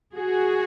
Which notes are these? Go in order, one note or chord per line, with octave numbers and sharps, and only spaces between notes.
F#4 G#4